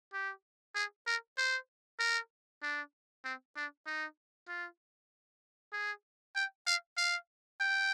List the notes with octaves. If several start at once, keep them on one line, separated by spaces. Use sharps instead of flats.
G4
G#4
A#4
C5
A#4
D4
C4
D4
D#4
F4
G#4
G5
F5
F5
G5